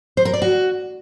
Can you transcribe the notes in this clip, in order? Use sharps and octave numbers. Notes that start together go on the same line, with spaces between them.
C5
A#4
D5
F#4